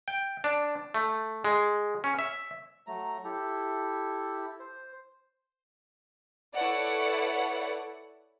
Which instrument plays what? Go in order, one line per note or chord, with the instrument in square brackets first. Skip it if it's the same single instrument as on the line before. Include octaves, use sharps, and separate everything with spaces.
[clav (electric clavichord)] G5
D4
A3
G#3
C#4
E5
[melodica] F#3 A3 A#5
E4 G4 A4
C5
[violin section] E4 A4 B4 C#5 D5 F#5